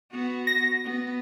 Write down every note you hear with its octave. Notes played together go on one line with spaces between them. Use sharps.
B3 F#4
A#6
B3